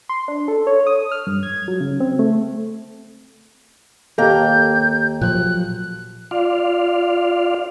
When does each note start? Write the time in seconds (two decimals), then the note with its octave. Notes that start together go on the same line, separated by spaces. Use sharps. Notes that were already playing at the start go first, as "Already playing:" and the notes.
0.09 C6
0.28 D4
0.48 A4
0.67 C#5
0.87 D#6
1.12 F6
1.27 G2
1.43 G#6
1.68 F#3
1.81 C#3
2.00 C4
2.19 A3
4.18 D#2 A#3 G4 A4 G5 G6
5.21 A#2 F3 F#3 F#6
6.31 F4 D5 F5